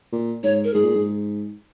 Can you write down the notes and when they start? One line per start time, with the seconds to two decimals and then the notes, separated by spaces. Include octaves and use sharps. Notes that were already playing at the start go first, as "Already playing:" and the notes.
0.12 A#2
0.43 G#2 C#5
0.64 A#4
0.74 G#2 G#4
0.85 A#2
0.95 G#2